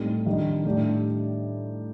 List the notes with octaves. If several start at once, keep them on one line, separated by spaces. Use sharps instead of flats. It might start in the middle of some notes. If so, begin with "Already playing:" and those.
Already playing: A2 G3 C4 D#4 A4
D#3 G3 D4
A2 G3 D4 G4 D5